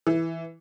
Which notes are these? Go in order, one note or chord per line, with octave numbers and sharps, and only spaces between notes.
E3